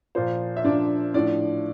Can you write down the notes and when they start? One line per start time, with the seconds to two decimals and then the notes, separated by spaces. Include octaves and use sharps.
0.15 A#2 F3 C5
0.57 E5
0.64 A#2 F3 D4 D5
1.14 A2 F3 D4 D5